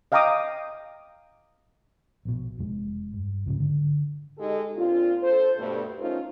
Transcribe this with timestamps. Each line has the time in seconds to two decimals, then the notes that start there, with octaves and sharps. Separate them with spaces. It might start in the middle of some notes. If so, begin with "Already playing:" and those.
0.12 D#5 F5 G5 A#5 D6 D#6
2.25 A#1 B2
2.58 F1 F2 G#3
3.13 G2
3.46 C#2 G#2 C#3 G3
3.60 D3
4.38 G#3 D#4 G4 A4
4.76 A#2 C4 D4 F4
5.22 A4 C5
5.58 G2 B2 A3
6.00 A3 C#4 D#4 F4 A#4 C5